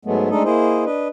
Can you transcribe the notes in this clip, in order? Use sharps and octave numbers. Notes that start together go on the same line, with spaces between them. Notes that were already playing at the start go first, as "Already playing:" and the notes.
G#2 F#3 G#3 A3 B3
G#3 A3 D4 D#4 A4 D#5
A#3 E4 G#4 C5 D#5
D4 B4 D#5